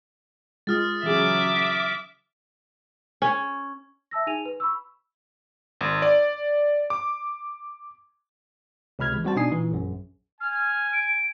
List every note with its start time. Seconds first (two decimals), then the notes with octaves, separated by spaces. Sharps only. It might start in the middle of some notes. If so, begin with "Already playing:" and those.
0.67 G#3 F4 D#6 F6 A6
1.03 C#3 E3 F#3 C#4 G#4 E5 D6
3.22 C#4
4.11 E5 A5 E6 A#6
4.27 D#4 G#4 G#5 D#7 F7
4.46 B4
4.60 B5 C#6 E6
5.81 G#1
6.02 D5
6.90 D6
8.99 C#2 C3 B5 F6 G#6
9.12 E3 G#3
9.24 G3 C4 F#4 C5 A5
9.36 B2 D4 D#4 G#5 D#6 C7
9.51 A#2 E3
9.72 A#1 F#2
10.41 G#5 F6
10.93 D7